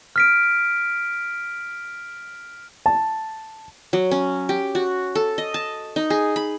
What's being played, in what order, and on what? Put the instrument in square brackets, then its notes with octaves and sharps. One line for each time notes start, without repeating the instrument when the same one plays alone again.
[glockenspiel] F6 B6 D7
[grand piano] A5
[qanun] F#3
C#4
G4
F#4
A4
D#5
A5
D#4
G#4
B5